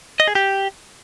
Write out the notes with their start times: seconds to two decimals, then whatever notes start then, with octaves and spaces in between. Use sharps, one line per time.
0.20 D#5
0.28 G#4
0.35 G4